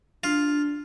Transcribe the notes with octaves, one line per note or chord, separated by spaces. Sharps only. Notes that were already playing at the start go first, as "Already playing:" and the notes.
D4 F4